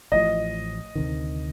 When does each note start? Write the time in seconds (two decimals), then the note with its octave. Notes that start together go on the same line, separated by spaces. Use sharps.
0.12 A1 A2 F3 D#5
0.95 D2 C3 D#3